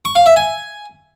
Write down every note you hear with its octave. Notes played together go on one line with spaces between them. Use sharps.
C#6
F5
E5
G#5